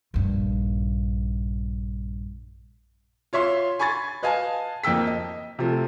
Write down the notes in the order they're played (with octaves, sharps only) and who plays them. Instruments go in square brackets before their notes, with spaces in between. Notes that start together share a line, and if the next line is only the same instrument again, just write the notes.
[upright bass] A#1 G2
[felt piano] F4 C#5 E5 C6
G#5 B5 C#6 G#6 A6
B4 D#5 F5 G#5 A5
F2 A#3 G5 E6 B6
D#5
C3 F3 A3